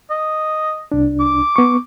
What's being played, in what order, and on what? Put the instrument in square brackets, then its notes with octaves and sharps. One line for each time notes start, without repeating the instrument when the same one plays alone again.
[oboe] D#5
[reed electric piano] C2 D4
[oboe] D6
[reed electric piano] B3 C#6